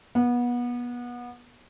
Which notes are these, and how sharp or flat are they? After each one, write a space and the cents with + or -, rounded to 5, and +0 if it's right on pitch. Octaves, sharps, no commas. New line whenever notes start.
B3 -25